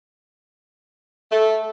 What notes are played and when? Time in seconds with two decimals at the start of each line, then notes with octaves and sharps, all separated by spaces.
1.31 A3